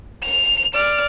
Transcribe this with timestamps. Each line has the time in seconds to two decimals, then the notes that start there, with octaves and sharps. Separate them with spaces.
0.24 F7
0.74 D5 F6